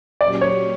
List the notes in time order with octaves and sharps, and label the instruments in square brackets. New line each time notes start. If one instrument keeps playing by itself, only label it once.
[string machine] A#2 F#3 A#3 C#4 G4 [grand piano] D5
[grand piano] C#5